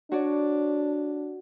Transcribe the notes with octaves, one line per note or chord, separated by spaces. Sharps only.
D4 F#4 C#5 D5